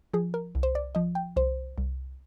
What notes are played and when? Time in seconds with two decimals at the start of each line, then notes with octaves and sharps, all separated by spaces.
0.13 F3 G#4
0.34 A#4
0.55 C2
0.63 C5
0.75 D5
0.95 F3 D#5
1.15 G5
1.36 C2 C5
1.78 C2